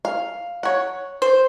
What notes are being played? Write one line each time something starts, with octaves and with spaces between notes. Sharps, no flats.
F5
C#5 F#5
C5